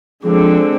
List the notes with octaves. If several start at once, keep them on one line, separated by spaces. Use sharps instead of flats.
D3 F3 G#3 C4